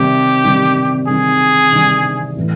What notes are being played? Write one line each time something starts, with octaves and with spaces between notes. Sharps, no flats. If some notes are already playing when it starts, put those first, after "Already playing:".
Already playing: C3 D#3 G3 C4 D#4 G4
C3 D#3 G3 C4 D#4
C3 D#3 G3 C4 D#4 G#4
C3 D#3 G3 C4 D#4
A2 E3